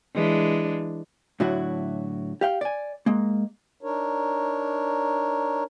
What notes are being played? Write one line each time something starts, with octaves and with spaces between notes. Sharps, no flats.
E3 G#3 D4
A2 D3 F#3 A3 E4 F#4
G4 F5 G5
D5 G#5
G#3 A#3
D4 D#4 A#4 C#5